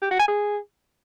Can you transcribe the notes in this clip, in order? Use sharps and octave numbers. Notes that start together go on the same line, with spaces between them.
G4
F#4
G#5
G#4